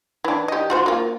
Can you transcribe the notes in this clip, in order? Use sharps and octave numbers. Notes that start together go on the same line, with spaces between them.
E3 D4
G4 D#5
F4 F#4 C5
A#3 F4